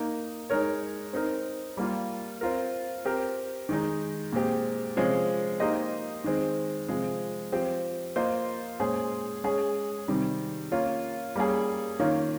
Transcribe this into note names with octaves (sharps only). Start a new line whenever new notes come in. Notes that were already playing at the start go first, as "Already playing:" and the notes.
Already playing: A#3 D#4 A#4 D#5
G#3 D#4 A#4 C#5
C4 D#4 A#4
G3 A#3 F4
C4 F4 A#4
C4 G4 A#4
D#3 G#3 D#4
A#2 G#3 C4 G4
C3 F3 G#3 C#4
A#3 D#4 G4 C5 D#5
D#3 G#3 C4
C3 F3 G#3
F3 C4 G4
A#3 F4 C5 D#5
A#2 G#3 C#4 G#4 C5
G#3 C#4 G#4
C3 D#3 G3
A#3 C#4 F4
G3 A#3 C#4 G#4
D#3 A#3 C#4 F4